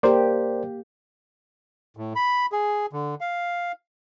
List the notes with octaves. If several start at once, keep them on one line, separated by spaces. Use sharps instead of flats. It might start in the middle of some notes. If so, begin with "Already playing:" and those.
A#3 G4 A#4 C5 D5
A2
B5
G#4
D3
F5